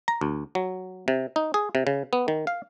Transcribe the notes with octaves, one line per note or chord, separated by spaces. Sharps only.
A#5
D2
F#3
C3
D#4
G#4
C3
C#3
B3
D#3
F5